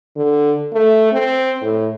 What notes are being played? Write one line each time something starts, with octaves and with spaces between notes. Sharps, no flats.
D3
A3
C4
A2